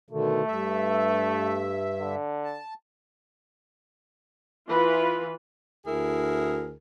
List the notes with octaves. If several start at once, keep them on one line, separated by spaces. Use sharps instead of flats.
B2 D3 D#3 A3
G2 E5
D3
A5
E3 F4 B4
D2 E4 G#4 A#4